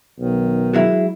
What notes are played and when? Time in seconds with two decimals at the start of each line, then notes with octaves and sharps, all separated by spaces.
0.19 B1 D#3
0.74 F#3 G#3 E4